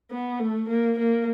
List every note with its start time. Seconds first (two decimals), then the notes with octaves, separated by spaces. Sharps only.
0.11 B3
0.40 A3
0.69 A#3
0.99 A#3